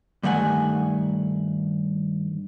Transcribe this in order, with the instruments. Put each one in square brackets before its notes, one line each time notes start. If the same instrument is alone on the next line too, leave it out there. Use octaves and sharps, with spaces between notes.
[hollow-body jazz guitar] G2 D#3 A3 F#5 G#5